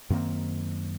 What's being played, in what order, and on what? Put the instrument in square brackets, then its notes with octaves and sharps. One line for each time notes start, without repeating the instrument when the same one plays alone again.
[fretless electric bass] F#2 D#3 A#3 C4